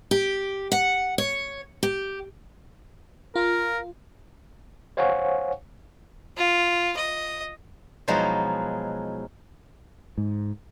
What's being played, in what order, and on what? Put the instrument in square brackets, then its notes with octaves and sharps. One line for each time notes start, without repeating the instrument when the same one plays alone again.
[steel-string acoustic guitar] G4
F#5
C#5
G4
[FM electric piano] F4 [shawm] A#4
[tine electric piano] C5 C#5 F5 F#5 G#5 C#6
[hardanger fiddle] F4
D#5
[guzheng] B2 F3 F#3 G#3 D#4 E4
[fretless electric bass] G#2